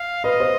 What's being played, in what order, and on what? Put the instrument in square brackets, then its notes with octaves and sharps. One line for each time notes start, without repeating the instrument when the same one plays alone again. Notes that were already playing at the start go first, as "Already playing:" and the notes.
Already playing: [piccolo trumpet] F5
[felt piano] B4 [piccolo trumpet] D#5
[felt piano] C5